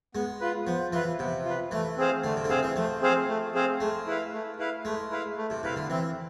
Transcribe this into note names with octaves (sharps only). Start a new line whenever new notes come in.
G#3 B3
F4 B4
F3 B3
E3 F4 B4
C3 B3
F4 B4
E3 A3
C4 G#4 C5 F5
D3 A3
C3
D3
C3 C4 G#4 C5 F5
E3
F3 A3
C4 G#4 C5 F5
A3
C4 G#4 C5 F5
G#3 A3
E4 B4 F5
A3
E4 B4 F5
G#3 A3
E4 B4 F5
A3
C3
C3 E4 B4 F5
D3
E3 C4